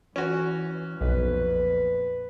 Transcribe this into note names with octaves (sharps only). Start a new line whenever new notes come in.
E3 C#4 F#4
B1 F2 A#2 B4